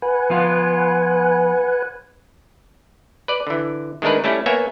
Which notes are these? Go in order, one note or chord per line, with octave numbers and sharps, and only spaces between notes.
B4 F#5 G#5
F3 B3 F4
B4 D5
D3 E3
D#3 G#3 A3 D4 A#4 B4
G3 A3 C#4 E4
A#3 B3 C#5 E5 G#5